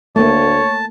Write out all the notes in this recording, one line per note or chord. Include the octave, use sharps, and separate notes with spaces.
D2 A3 A#3 C#5 A5